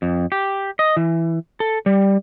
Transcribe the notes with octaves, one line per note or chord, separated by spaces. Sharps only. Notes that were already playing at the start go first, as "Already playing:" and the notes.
F2
G4
D#5
E3
A4
G3